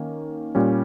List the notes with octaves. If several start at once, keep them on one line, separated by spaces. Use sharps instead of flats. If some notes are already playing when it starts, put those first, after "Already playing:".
Already playing: D#3 A#3 C#4
A#2 G3 C#4